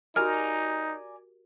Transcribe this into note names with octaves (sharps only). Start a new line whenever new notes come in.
D#4 F#4 G4 A#4 D5 G#5 A#5 F6